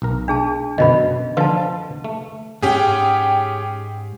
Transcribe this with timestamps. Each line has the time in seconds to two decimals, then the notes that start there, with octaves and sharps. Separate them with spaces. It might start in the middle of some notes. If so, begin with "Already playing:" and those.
0.02 B1 A#4
0.28 D4 G#4 A5
0.78 F#2 B2 D3 D#5 B5
1.37 D3 F3 F4 B4 A5
2.04 A3
2.62 G#2 C#4 G4 G#4 G5